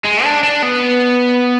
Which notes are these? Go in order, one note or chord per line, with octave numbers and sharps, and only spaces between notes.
G#3
D4
D4
B3